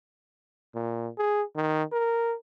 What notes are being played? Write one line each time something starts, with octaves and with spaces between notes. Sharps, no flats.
A#2
G#4
D#3
A#4